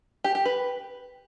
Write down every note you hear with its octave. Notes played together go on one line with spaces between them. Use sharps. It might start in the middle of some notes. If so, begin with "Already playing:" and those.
G4
G4
B4